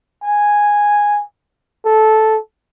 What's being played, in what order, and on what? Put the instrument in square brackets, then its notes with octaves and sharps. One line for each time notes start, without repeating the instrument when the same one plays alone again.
[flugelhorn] G#5
A4